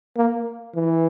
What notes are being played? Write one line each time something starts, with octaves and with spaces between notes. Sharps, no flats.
A#3
E3